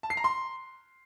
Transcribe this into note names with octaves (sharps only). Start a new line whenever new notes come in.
A5
C7
A#5
C6